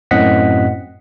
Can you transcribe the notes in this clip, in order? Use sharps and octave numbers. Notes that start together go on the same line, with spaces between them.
F#2 A2 C4 D#5 F#5 B6